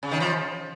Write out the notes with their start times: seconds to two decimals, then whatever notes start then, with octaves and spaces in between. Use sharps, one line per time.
0.03 C#3
0.11 D#3
0.20 F3